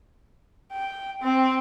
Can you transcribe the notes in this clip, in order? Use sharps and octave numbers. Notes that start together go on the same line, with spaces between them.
G5
C4